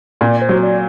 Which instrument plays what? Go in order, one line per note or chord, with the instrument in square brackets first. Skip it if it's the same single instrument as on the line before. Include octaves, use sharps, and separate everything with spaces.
[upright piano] A#2 [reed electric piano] D5
[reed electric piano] C5
[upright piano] F#3
[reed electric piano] D5